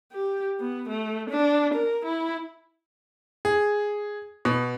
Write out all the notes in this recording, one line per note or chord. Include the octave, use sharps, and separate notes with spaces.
G4
B3
A3
D4
A#4
E4
G#4
B2